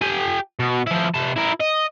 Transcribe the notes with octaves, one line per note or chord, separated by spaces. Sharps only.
G4 G#5
B2
F3 E4
C3 A5
E4 A#4
D#5